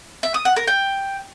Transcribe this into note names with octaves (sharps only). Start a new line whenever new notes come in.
E5
D#6
F#5
A#4
G5